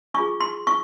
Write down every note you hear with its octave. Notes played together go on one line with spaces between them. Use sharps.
D4 F4 G#4 C#6
C6
C#6